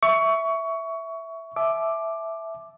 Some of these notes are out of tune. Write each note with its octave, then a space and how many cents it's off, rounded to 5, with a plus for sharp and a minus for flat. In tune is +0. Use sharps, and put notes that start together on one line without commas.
E5 +0 C#6 +20
E5 +0 A5 -40 D6 +5